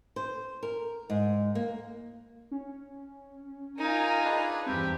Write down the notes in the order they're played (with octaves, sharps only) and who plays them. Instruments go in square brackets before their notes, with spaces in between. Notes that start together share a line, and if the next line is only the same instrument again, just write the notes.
[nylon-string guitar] C5
A#4
G#2
A#3
[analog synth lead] C#4
[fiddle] D#4 F4 [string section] A#4 G#5 A#5
[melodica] D4 G#4 B4 [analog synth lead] D#5
[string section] E2 G2 [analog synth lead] C4 [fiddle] G4 [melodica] C5 E5